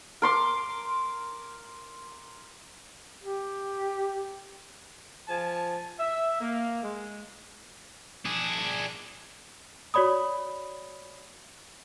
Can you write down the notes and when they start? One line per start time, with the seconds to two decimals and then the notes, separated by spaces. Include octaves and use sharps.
0.22 A#4 C6 D6
3.23 G4
5.28 F3 G#5 A5
5.99 E5
6.40 A#3
6.83 G#3
8.25 D4 G#4
9.94 F#4 C#5 D5 B5 D#6